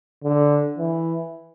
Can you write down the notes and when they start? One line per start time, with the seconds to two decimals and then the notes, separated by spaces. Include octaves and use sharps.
0.24 D3
0.78 E3